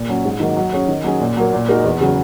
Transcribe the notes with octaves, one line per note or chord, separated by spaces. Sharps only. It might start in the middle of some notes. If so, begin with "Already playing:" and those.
Already playing: A#2
F#3 C#4
G#2
D#3 F#3 A#3
F#3
C#4 G#4 C#5
D#3
F#3 C#4 G#4
A#2
F#3 A#3
A#2
G#3 D#4 F#4 A#4
E2
C#3 F#3